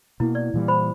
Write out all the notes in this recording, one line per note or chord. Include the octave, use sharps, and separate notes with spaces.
B2 A#3 E4
D5
A#2 E3 G3
C5 B5